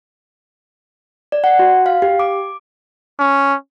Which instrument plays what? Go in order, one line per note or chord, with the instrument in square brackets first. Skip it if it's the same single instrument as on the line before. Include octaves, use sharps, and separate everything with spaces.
[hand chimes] D5
F#5
F#4
F5
G4
D6
[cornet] C#4